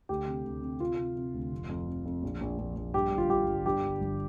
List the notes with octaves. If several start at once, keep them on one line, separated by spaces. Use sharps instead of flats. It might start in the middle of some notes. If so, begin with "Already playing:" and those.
D2 G4
C3
D2
C3
C3 F4
C3
C3
D2
F1
F2
C3
F2
A#1
A#1
A#1
A#1
G2 G4
G1
F4
G1 G4
G1
G2 G4
G1
G1